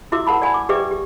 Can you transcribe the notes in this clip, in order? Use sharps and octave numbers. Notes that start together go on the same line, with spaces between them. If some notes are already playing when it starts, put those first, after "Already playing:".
E4 F#4 E5 D6 E6
A#4 F#5 A5 B5
D5 F#5 G#5 A5 B5
D6
G4 B4 D5 E5 G5 D6
G4